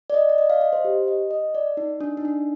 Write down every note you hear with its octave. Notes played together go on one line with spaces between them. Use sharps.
D5
D#5
D5
D#5
F5
D#5
C5
G4
D#5
D#5
D5
D#4
D4
D#4
D4